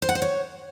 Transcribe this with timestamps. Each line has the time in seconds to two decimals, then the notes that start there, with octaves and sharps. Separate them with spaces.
0.02 C5
0.09 F#5
0.15 C5
0.22 C#5